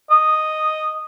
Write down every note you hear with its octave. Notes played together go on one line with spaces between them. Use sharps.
D#5